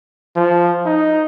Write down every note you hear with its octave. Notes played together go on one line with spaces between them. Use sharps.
F3
D#4